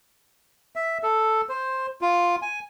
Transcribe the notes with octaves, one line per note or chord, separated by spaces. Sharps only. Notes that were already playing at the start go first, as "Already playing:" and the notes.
E5
A4
C5
F4
G#5